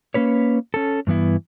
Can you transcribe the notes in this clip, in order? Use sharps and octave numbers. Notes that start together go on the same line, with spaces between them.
A#3 C#4 B4 C#5
C#4 A4
G2 E3 B3 E4